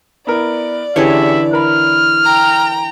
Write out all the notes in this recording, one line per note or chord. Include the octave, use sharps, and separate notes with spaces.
B3 E4 A#4 D5
D3 E3 C#4 G4 G#4 C#5 E5
A#4 B5 F6
G5 A#5